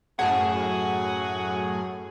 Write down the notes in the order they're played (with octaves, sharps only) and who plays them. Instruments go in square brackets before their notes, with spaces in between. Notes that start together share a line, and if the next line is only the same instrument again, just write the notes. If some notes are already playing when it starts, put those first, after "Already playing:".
[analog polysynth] F#2 A2 G#4 [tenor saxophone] F#4 [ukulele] F#5 A5